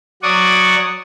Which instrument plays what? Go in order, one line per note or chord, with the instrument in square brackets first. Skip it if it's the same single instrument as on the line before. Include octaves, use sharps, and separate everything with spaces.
[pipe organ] F#3 D5 F#5 C#6 D#6